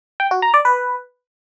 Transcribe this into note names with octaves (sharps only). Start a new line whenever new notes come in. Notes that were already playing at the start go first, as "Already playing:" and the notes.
G5
F#4
A#5
D5
B4